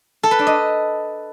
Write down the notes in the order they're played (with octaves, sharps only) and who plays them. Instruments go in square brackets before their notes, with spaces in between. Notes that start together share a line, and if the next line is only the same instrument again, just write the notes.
[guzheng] A4
B4
D4
D#5